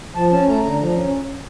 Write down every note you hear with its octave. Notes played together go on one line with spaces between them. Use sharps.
F3 A5
C#4 A5
A3 A#5
D3 A#5
F3 A#5
C#4